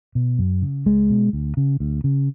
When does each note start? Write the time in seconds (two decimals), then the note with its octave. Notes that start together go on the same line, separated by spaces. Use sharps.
0.15 B2
0.39 F#2
0.62 C#3
0.86 C#2 G#3
1.10 B2
1.33 D2
1.57 C#3
1.80 D2
2.04 C#3